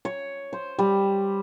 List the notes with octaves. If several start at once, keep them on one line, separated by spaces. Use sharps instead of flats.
C#5
C5
G3